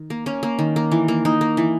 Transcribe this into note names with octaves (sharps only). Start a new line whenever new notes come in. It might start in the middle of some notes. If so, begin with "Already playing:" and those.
Already playing: D#3
A#3
A#3 C#4
A#3
D#3
A#3
E3
A#3
A#3 D#4
A#3
E3